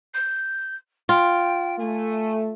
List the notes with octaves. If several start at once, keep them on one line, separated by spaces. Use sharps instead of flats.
G6
F4 G5
A3 G#5